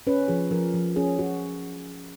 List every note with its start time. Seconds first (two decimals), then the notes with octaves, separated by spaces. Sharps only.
0.07 C#4 B4
0.28 F3 G#4
0.51 F3 A#4
0.74 F3
0.96 C#4 G#4
1.19 F#4